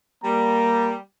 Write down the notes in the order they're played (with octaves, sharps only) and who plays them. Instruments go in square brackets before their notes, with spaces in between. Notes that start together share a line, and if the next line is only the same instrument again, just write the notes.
[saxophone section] G3 [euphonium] A#3 [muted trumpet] A#5